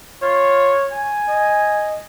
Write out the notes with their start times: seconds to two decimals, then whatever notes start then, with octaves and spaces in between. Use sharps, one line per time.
0.22 F4 C#5
0.91 G#5
1.28 D#5